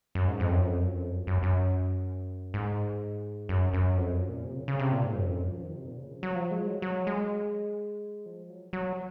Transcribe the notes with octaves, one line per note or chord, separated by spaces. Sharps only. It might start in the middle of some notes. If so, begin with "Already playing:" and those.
F#2
G#2
F2
F#2
F2
F#2
F2
F#2
F#2
F#2
G#2
F#2
F#2
F2
F#2
A#2
C3
C#3
C#3
C3
A#2
G#2
F#2
F2
F#2
F3
D#3
C3
A#2
C#3
F3
F#3
F3
G#3
F#3
F#3
G#3
F3
F#3
F#3